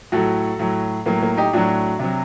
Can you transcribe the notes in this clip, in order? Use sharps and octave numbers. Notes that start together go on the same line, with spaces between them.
A2 F#3 F#4 A4
A2 F#3
A2 F#3 A#3
A#3
D#4 G4
A2 F#3 D4 F#4
C3 F#3